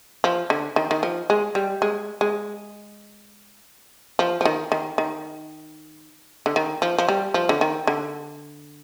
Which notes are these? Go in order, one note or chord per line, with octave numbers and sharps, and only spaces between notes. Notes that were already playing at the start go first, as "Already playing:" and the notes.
F3
D3
D#3
D#3
F3
G#3
G3
G#3
G#3
F3
F3
D#3
D#3
D#3
D3
D#3
F3
F3
G3
F3
D3
D#3
D3